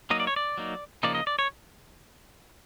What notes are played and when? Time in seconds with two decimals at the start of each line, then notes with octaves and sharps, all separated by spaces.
0.10 F#3 A#3 D#4 D#5
0.20 D5
0.27 C#5
0.36 D5
0.58 F#3 A#3 D#4
1.03 C#3 F3 A#3 D#4 D5
1.15 D#5
1.27 D5
1.39 C#5